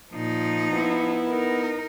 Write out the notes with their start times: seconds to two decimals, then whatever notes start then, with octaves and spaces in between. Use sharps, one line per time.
0.13 A#2 F3 D#4
0.72 B3 E4
1.28 D#4 A#4